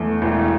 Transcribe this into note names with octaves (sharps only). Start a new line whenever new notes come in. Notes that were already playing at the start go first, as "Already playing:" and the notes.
Already playing: E2 A3
E1